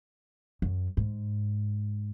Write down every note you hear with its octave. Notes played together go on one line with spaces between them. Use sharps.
F#2
G#2